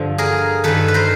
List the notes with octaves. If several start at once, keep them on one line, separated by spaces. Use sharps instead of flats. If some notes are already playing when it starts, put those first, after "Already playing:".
Already playing: G2 D3 F3
G#4 A#4
G2 D#3 A4 B4
B4
A#4 C5